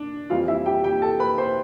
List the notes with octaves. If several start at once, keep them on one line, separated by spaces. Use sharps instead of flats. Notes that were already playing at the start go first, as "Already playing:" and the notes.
Already playing: D4
F2 E3 G3 F4 F5
E4 E5
G4 G5
G4 G5
A4 A5
B4 B5
C5 C6